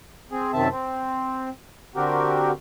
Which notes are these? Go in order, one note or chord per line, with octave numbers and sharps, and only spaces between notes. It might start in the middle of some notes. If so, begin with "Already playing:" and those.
C4 G#4
F#2 C3 D#3 C4 E5 A5
C4
D3 C4 F#4 G4 A#4